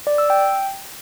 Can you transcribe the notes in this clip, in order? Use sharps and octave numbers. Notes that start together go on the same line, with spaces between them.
D5
E6
G5